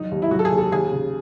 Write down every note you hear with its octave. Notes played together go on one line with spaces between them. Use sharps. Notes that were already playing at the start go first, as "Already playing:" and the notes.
Already playing: E2 F#3 D#4
D#2
E4
F#3 F#4
A4
G#4
D#2
A4
D#2 G#4
C#3